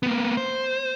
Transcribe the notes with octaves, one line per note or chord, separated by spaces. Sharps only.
A#3 B3
C5